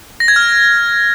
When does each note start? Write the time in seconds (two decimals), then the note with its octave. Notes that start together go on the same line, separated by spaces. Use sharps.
0.20 A#6
0.28 G#6
0.36 F6